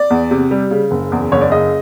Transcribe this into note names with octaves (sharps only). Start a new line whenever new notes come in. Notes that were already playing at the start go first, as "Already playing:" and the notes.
Already playing: D5
E2
C3
G3
C#3
F#1
E2
F#1 C#5
D5
C#3 D#5